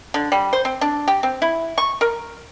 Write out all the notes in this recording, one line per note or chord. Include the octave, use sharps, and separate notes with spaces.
D3
G3
C5
C4
D4
G4
C4
E4
C#6
A#4